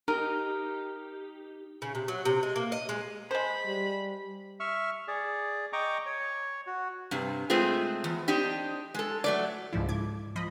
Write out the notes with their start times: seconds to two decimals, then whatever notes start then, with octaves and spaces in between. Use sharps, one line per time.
0.08 D#4 G4 A#4
1.82 C#3
1.95 C3
2.08 F#3
2.25 C3
2.43 G#3
2.56 A#3
2.72 D#5
2.89 G#3
3.31 G#3 C5 B5
3.67 G3
4.60 E5 C#6 F6
5.08 G#4 D5
5.73 D#5 G5 A#5 C#6 D6
6.06 C#5
6.67 F#4
7.11 G2 C3
7.50 G#3 A3 C4 F4 G#4
8.04 E2
8.28 C4 D4 D#4 G4
8.95 G#3 A4
9.24 F#3 A3 D5
9.73 C#2 G#2 F3 E4
9.89 G#2 D6 G#6
10.36 F3 D#5 B5